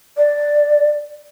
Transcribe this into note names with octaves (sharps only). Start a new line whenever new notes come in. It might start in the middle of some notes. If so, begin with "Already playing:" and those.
D5